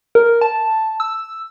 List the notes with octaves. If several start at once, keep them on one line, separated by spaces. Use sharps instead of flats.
A#4
A5
E6